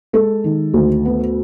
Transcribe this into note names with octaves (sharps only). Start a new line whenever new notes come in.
G#3 A4
D#3
D2
B3